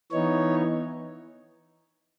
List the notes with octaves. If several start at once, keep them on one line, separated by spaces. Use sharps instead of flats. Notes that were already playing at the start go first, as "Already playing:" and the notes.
E3 B3 D#4 C#5